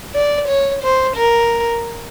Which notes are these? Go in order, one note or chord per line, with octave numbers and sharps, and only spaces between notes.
D5
C#5
C5
A#4